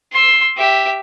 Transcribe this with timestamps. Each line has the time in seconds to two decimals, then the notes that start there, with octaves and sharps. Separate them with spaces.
0.12 C6 E6
0.57 G4 E5